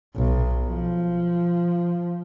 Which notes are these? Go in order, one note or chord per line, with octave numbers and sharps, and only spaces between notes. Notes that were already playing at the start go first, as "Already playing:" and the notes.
B1
F3